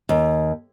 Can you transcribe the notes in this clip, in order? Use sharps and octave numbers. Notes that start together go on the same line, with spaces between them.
D#2